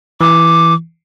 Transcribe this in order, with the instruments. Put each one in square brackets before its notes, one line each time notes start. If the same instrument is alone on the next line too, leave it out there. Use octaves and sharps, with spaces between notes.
[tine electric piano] E3 [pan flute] D6